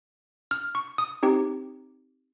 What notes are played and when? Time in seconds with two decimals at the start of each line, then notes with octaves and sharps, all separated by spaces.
0.51 F6
0.75 C#6
0.98 D#6
1.23 C4 D#4 G4